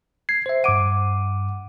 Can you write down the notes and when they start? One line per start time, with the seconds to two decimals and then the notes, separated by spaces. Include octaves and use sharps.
0.29 G#6 C7
0.46 C5 E5
0.64 G2 F#5 D6 D7 D#7